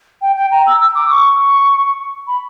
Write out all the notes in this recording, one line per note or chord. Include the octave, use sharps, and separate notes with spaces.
G5
G5
A#5
E6
E6
D6
C#6
B5